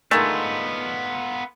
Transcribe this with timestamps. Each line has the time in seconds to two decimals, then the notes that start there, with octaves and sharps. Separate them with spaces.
0.11 D3 D#3 G#3 A3 B3 F4